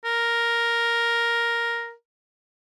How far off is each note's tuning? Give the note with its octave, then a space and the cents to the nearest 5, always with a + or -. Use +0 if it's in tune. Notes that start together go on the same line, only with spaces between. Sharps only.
A#4 +5